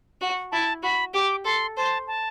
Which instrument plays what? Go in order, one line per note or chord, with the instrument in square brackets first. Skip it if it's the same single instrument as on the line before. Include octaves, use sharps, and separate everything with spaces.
[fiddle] F#4
[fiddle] E4 [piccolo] A5
[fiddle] F#4 [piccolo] B5
[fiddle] G4 [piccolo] D6
[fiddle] A4 [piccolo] C6
[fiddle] C5 [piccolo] A5
[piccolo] A5